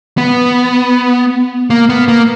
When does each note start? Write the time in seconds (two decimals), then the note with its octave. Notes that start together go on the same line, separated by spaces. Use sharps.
0.18 B3
1.70 A#3
1.89 B3
2.08 A#3